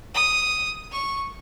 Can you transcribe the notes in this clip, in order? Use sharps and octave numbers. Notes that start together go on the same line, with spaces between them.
D#6
C#6